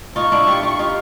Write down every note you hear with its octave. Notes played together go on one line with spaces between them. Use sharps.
D#4 F4 C#6
D4 E4
F4 G4
F4 G4
D#4 F4